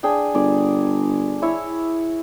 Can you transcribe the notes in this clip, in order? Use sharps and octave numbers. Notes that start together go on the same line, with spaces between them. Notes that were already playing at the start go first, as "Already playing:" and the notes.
D4 G#4 G5
G1 D5
E4 C#5